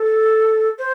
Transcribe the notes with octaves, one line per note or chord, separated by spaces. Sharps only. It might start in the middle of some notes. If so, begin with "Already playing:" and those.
Already playing: A4
C5